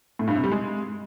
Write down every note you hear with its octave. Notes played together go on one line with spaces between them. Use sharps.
A2
G2
C3
G3
G#3